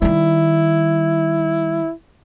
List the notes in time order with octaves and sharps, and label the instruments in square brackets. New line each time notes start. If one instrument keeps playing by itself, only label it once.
[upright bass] D#3 G3 [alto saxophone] E4